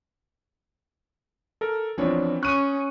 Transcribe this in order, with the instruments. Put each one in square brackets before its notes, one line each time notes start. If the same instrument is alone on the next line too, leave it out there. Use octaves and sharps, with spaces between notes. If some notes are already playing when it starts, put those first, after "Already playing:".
[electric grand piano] A4 A#4
[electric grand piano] E3 B3 C4 [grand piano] F3 D4 C#5
[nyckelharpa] C#4 [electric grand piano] C#6 D#6 [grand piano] F#6 D#7